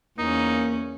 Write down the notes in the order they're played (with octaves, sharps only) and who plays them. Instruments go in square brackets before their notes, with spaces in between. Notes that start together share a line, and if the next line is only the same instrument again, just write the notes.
[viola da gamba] E2 C#4 [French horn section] A#3 [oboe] D#4